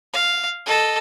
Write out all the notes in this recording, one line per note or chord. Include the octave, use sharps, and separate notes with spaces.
F5
A4 D#5